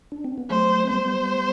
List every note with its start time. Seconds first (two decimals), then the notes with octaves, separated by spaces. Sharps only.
0.12 D4
0.24 C4
0.38 B3
0.50 F#3 A3 C5
0.84 C4
0.89 G3 B3 C5